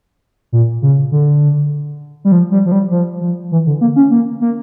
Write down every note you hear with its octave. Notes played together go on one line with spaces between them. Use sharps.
A#2
C#3
D3
G3
F3
G3
F3
G3
F3
F3
E3
D3
A#3
C#4
A#3
A#3